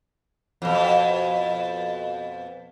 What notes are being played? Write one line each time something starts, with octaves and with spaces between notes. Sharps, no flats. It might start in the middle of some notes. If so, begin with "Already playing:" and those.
F2 B2